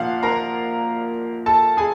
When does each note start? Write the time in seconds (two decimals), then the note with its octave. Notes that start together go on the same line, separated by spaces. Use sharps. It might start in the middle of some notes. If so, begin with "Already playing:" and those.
Already playing: A#2 F3 A#3 D4 F5 F#5
0.23 A#4 A#5
1.46 A4 A5
1.77 G#4 G#5